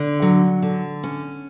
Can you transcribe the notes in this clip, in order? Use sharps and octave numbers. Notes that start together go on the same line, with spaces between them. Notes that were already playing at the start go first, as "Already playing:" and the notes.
Already playing: D3
F#3
D3
C#4